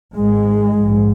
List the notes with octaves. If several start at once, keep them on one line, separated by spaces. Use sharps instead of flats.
G#1 G#2 G#3
A#1 G#2